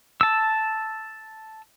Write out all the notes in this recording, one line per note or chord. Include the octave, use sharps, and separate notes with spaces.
A5 E6